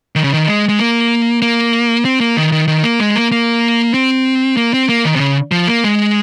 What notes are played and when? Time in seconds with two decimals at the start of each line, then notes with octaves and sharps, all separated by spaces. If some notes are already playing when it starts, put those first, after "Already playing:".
0.15 D#3
0.24 C#3
0.34 D#3
0.48 G#3
0.69 G#3
0.79 A#3
1.42 A#3
2.05 C4
2.20 A#3
2.37 D#3
2.52 D#3
2.68 D#3
2.83 A#3
3.00 G#3
3.16 A#3
3.32 A#3
3.94 C4
4.57 A#3
4.73 C4
4.89 A#3
5.05 D#3
5.16 C3
5.20 C#3
5.51 F3
5.67 A#3
5.84 G#3